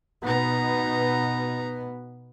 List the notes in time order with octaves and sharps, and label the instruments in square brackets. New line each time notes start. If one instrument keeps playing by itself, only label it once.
[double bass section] B2 B3 [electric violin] D#4 A#5